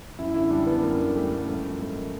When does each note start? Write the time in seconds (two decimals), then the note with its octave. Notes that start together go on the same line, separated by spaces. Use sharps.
0.19 F#2 E4
0.34 D3 E4
0.50 G3 D4
0.67 F#2 B3
0.83 F#2 A#3
0.99 D3
1.15 G3 A3
1.32 F#2
1.39 A#3
1.48 G#2 A3
1.64 F3
1.80 G#3 A#3